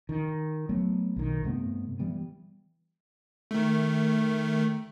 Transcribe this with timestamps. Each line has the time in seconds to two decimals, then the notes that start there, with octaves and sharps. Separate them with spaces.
0.09 D#3
0.69 F#3 A3 B3
1.16 B1 D#3
1.44 G2 C3 A3 B3
1.99 E3 G3 B3
3.51 D#3 A3